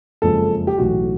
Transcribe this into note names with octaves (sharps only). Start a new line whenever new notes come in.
F#1 F2 C#3 F3 G#3 A4
G4
B1 A2 E3 F#4